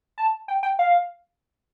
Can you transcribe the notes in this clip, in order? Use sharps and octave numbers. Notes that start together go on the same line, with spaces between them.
A5
G5
G5
F5